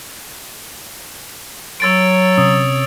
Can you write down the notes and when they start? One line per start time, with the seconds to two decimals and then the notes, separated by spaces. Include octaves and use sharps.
1.80 F#3 C#5 E6 A6 D7
2.38 C3 C#4 D#6